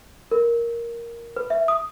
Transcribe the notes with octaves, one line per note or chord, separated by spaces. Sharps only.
A#4
B4
E5
D#6